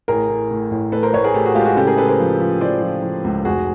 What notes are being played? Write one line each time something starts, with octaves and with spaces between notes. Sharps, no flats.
A1 G#4 A#4
A2
A2
A1
A2 A4 B4
A#4 C5
A1 B4 C#5
G#4 A#4
A2 G4 A4
F#4 G#4
G#3 F4 G4
F#4 G#4
C#3 G4 A4
G#4 A#4
C#3 A4 B4
A#4 C5
F3
F3
F3 C5 D5
F3
F3
C#2
F1 F#4 G#4